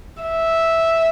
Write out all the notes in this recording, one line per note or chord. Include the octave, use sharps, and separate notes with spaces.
E5